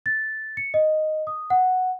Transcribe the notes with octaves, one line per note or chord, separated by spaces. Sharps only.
A6
C#7
D#5
D#6
F#5